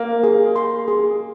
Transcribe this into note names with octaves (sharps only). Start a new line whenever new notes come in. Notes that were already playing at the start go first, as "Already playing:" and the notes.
Already playing: A#3 F5
G#4
C6
G#4